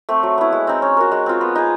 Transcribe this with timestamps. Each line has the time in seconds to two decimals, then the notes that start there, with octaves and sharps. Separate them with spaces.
0.09 A3 C4
0.23 F#3
0.38 B3 E4
0.52 G#3
0.67 C4 D#4
0.82 C#4
0.97 F#4 A#4
1.12 G#3
1.26 C4 F4
1.41 B3
1.55 D#4 G#4